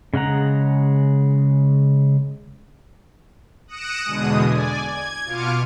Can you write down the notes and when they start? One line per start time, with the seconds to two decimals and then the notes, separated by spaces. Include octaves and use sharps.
0.14 C#3 G#3 F#5 A#5
3.67 D#6 F#6 A#6 C#7 D7 E7
4.04 E2 B2 D3 G#3 D#6
4.44 D5 G#5
4.80 G#6
5.25 B2 F4 D6 F6 C#7 D#7